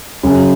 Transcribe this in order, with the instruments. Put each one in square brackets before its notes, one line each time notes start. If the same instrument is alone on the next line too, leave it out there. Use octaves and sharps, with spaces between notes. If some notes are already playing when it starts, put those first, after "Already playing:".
[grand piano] F#2 C#3 F#3